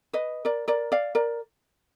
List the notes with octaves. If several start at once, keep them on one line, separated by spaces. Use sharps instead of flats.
B4 D#5
A#4 D5
A#4 D5
D5 F5
A#4 D5